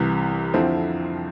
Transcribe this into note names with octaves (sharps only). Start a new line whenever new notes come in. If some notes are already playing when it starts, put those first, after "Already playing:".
Already playing: C2 C3 E3
F2 D3 F3 C4 E4